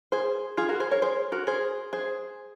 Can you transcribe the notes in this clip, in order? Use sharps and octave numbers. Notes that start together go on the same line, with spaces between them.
G#4 C5
F4 G#4
F#4 A#4
G#4 C5
A#4 C#5
G#4 C5
F#4 A#4
G#4 C5
G#4 C5